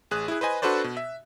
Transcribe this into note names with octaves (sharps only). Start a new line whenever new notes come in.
A1 G#4 F#6
E4 G#4
B4 C5 D#5 G#5
D4 F#4 A4 B4 C5 D5
B2
E5